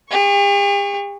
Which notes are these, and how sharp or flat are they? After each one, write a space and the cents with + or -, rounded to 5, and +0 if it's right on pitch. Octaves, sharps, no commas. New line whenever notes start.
G4 +45 C#6 +0